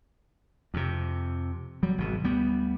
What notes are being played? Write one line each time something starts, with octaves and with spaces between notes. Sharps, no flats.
F2 C3
F#3 G3
G#1 B2
D2 G3 B3